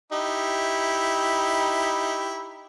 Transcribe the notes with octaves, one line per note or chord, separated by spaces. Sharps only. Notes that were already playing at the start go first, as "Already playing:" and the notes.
D#4 E4 G4